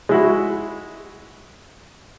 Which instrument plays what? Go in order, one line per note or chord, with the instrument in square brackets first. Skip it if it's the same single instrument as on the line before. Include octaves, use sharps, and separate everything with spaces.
[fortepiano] G#3 E4 F#4